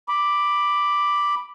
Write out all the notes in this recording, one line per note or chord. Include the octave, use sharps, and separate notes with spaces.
B5 D6